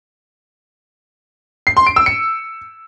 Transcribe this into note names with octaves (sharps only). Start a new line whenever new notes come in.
C7
C6
D7
E6
C#7